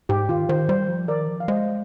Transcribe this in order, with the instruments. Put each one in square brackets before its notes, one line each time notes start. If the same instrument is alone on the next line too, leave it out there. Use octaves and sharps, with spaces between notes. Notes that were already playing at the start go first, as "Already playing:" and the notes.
[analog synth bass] G#2 [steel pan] G4
[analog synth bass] D#3 [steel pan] F4
[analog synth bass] D#3 [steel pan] C5
[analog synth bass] G3 [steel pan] C5
[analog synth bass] F3
[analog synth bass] D#3 [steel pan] A#4 D5
[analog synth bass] F3
[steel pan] F5
[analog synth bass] G#3 [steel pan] C5 D#5